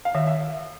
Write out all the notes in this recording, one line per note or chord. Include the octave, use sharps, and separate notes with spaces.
F5
D#3 E5
E5